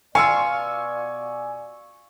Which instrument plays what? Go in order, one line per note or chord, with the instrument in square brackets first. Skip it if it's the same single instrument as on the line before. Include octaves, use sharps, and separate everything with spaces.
[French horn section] B2 D5 [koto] F4 F5 [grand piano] G#5 [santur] C#6 E6